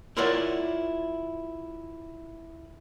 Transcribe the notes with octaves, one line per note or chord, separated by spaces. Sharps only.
E4 F4 A#4 C#5 D5 F#5